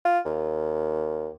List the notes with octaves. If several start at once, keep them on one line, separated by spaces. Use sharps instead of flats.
F4
D#2